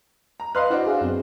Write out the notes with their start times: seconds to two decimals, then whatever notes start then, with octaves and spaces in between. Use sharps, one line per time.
0.40 A#5
0.55 B4 D#5 F5 C6 F6 F#6
0.70 D4 E4 F#4 C5
0.87 G#4 E5 F5
1.01 F#2 B3 C4